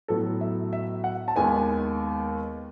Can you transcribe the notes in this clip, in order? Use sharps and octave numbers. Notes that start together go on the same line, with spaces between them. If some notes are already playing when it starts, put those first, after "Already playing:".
A2 F#3 B3 A4
E5
E5
F#5
A5
D#2 D#3 G#3 B3 G#5